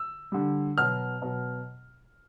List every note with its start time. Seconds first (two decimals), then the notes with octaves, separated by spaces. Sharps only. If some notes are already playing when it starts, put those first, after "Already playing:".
Already playing: E6
0.32 D3 G3
0.78 B2 F#3 F6
1.22 B2 F#3